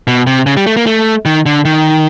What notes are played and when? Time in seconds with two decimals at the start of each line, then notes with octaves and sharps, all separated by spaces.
0.07 B2
0.27 C3
0.46 C#3
0.57 G3
0.67 A3
0.77 A#3
0.87 A3
1.25 D#3
1.46 D3
1.65 D#3